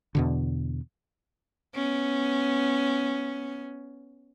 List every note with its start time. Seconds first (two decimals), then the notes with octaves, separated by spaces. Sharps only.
0.15 E2 B2 D3
1.75 B3 C#4